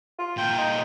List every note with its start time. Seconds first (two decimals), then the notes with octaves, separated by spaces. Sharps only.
0.19 F4
0.38 A#2 G5
0.58 D#4